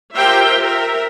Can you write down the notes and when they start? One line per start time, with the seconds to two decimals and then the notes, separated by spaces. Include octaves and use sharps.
0.15 F4 G4 A#4 C5 E5 G5
0.60 A#4 E5